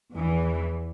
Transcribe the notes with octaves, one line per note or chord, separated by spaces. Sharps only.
E2 E3